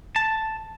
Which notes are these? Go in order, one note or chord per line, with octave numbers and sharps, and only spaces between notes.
A5